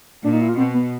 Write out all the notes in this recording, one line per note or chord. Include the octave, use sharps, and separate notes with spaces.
A#2 D4
D#4
E4
F4
B2 C4
B3